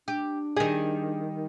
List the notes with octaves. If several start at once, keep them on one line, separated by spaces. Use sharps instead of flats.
D4 G4
D#3 G3 G#4